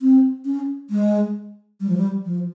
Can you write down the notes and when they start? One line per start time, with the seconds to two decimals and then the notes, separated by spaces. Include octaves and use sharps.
0.01 C4
0.45 C#4
0.90 G#3
1.80 G3
1.89 F3
1.97 G3
2.25 F3